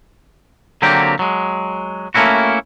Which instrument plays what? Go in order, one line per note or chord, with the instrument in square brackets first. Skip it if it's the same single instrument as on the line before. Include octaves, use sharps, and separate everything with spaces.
[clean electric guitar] D3 F#3 A#3 C4 G4
F#3 G#3
A3 A#3 C#4 E4 F#4